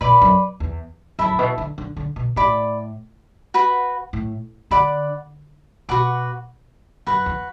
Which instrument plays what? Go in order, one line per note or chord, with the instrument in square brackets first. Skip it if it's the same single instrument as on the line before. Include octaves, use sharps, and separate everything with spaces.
[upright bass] B2 [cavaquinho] B4 D5 B5 D6
[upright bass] F#2
E2
[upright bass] F#2 [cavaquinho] E4 A4 E5 B5
[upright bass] A2
B2
D3
D3
D3
B2
[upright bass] A2 [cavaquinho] D5 B5 D6
[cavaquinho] F#4 B4 F#5 B5
[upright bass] A2
[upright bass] D3 [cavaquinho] D5 F#5 B5 D6
[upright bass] B2 [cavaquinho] F#4 B4 F#5 D6
[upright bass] F#2 [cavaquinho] F#4 B4 F#5
[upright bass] E2